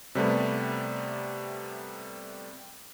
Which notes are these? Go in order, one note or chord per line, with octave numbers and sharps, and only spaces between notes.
C3 G3 A3 B3